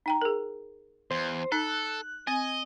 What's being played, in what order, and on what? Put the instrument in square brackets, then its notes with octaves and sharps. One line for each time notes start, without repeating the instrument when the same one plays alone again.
[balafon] D#4 G5 A#5
G#4 A#4
[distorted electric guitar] E2 [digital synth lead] C5
[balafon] D#4 [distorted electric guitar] A4 [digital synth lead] F#6
[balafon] C4 [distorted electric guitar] D#5 [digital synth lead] G#5